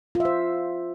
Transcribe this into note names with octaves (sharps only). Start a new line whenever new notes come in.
F4
E5
C5